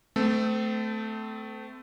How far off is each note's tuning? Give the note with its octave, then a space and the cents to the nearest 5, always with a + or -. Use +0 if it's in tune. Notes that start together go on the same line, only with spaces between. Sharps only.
A3 +0 C4 -35 A4 +0